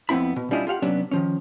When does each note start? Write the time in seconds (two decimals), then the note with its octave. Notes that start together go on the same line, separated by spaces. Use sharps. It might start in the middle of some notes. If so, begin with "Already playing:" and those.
0.09 F2 B3 C4 E4 B5
0.36 B2
0.51 G3 C#4 D4 E4 F4 D#5
0.67 F4 G4 F5 F#5
0.82 C3 F#3 B3 C#4 D4
1.11 D#3 F3 C#4